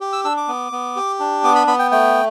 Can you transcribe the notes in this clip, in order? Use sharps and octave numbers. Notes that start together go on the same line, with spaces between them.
G4
E6
D4 E6
D6
B3
B3
G4
D4
B3 D6
B5
B3 B5
G5
A3 G5